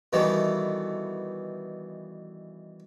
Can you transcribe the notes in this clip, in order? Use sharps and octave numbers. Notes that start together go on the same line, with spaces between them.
B2 D#3 E3 G3 A3